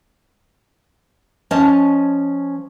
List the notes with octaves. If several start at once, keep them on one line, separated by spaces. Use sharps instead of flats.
F3 C#4 C#5 D#5 A5